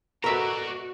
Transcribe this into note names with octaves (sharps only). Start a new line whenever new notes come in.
B2 F#4 A4 A#4 D5 E5 A#5